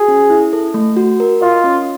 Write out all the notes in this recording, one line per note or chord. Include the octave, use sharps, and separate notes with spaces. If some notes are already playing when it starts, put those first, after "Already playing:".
Already playing: F#4 G#4
C#4
E4
A4
A3
F#4
A#4
F4 D#5
C#4